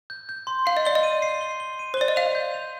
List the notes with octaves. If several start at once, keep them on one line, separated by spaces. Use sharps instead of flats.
G6
G6
C6
F5 C7
D#5
D5 G7
D#5
D#7
C7
G7
G7
D#7
C5
D5 G7
D#5
F5 F7
G6
F7